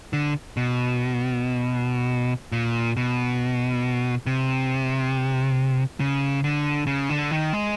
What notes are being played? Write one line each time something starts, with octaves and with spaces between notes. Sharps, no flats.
D3
B2
A#2
B2
C3
C#3
D3
C#3
D3
D#3
G#3